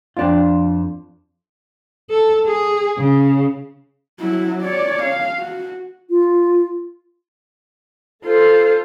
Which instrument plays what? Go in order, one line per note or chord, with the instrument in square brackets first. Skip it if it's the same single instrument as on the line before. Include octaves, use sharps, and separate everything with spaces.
[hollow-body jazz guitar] F2 D4 F4
[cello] A4
G#4
C#3
[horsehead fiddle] F#3 E4
C#5 D5
F5
F#4
[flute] F4
[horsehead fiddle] F4 C5 [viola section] A4